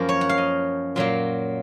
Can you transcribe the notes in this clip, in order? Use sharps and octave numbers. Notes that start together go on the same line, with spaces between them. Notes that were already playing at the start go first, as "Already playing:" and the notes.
Already playing: F#2 F3 A#3 A#4
C#5
F#5
F5
D#5
A#2 F#3 A#3